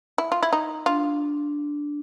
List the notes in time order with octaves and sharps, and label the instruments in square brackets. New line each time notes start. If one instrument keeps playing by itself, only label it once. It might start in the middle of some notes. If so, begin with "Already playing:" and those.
[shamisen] E4
F4
E4
D#4
[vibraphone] D4 [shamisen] F4